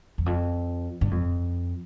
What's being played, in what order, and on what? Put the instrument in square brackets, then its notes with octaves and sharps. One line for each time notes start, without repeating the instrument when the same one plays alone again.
[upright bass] E2
F2
G2
F2